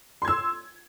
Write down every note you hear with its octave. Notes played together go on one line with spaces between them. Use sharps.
C6 E6 G#6